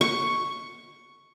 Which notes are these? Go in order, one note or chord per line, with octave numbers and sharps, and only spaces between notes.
C#6